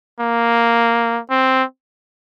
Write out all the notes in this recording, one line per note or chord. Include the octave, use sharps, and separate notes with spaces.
A#3
C4